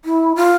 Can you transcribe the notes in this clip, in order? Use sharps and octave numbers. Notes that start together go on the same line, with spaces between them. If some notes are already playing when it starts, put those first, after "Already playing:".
E4
F4